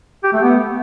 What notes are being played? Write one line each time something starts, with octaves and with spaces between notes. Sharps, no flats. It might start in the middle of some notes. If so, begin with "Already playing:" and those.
G4
A3
B3